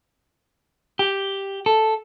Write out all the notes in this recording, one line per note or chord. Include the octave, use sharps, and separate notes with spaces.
G4
A4